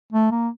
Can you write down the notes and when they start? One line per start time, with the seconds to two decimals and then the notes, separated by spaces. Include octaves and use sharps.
0.12 A3
0.31 A#3